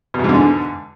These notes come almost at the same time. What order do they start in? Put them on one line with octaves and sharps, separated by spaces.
B2 E2 G#2 D3